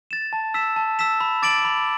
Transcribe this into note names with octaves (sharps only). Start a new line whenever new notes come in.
A6 E7
A5
E6 B6 E7
A5
E6 B6 E7
B5
D6 A6 D7 F#7
B5